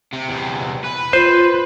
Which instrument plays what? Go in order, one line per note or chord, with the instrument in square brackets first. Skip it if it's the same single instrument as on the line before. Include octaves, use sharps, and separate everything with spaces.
[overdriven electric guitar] C3
E2 C3
B4
[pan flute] F4 [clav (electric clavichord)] C5